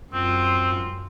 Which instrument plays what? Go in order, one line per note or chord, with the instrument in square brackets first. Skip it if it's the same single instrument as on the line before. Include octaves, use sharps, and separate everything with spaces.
[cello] F#2 F4 [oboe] C4